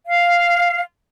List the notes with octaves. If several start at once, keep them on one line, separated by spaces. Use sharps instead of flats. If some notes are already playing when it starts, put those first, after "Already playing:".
F5